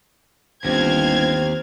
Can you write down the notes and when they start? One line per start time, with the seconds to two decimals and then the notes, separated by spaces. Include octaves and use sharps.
0.65 G1 D#2 C4 F6 G#6